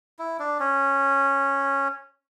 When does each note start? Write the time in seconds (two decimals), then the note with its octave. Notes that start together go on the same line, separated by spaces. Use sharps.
0.19 E4
0.39 D4
0.60 C#4